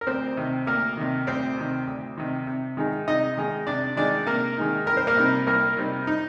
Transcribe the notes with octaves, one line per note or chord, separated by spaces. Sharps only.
A#4
D2 C4 C5
C3 D#3
D2 A#3 A#4
C3 D#3
D2 C4 C5
C3 D#3
D2
C3 D#3
C3
D#3 G#3 D#4
C3 D#4 D#5
D#3 G#3 D#4
C3 D4 D5
D#3 G#3 D4 D#4 D5
C3 A#3 A#4
D#3 G#3 D#4
C2 A#4
C5
A#3 A#4
C3 G3 C4 D#4
C2 A#3 A#4
C3 G3 C4 D#4
D#4